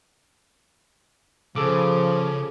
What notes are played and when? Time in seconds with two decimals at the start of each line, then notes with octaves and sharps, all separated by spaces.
1.56 C#3 F3 G#4 A4 D6